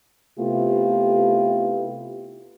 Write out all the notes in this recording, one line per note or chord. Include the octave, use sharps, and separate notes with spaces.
C3 A3 B3 E4 F4 G4